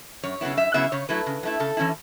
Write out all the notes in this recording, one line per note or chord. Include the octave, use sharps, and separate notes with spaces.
F#2 C#5
C#3 F#3 B3 E4
F#2 E5
C#3 F#3 B3 E4 E5
C#3 C#5
F#3 A3 E4 B4
C#3
F#3 A3 E4
C#3 A4
E3 C#4 E4